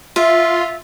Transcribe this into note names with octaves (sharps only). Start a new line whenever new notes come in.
F4 E5